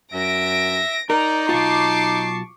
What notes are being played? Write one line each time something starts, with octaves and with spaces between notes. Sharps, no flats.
F#2 E5 A#6 D7
D#4 A#4 D5 A#5
B1 F2 F4 A5 C#6 D6 C7